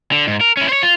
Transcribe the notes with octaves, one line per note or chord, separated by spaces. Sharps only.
D3
G#2
A#4
C#4 E4
C5 C#5
F4